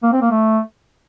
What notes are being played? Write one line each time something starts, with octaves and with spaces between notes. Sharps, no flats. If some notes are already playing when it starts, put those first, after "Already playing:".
A#3
C4
A#3
A3